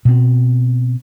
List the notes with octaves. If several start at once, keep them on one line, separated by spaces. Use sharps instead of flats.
B2 C4